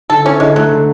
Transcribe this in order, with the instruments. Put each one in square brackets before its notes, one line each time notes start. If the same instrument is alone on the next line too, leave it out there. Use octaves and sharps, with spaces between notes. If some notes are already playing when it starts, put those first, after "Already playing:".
[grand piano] D3 [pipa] A4
[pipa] C#4 [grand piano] E4
[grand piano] D3 [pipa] G#3
[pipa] F#3 [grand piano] A3
[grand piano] D3